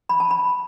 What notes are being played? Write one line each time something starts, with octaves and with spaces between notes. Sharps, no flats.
B5
A5
B5